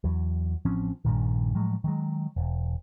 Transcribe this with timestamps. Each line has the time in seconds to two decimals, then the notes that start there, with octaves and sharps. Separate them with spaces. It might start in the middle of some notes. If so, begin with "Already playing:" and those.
0.04 E2 F#3
0.65 A1 F3 C4 C#4
1.05 A#1 G2 A#2 D#3
1.55 A2 F3 F#3 G#3
1.84 D#3 F#3 G#3
2.36 E1